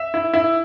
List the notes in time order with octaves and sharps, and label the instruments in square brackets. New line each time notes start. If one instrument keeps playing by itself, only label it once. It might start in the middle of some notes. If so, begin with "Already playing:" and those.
Already playing: [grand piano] E5
E4
E4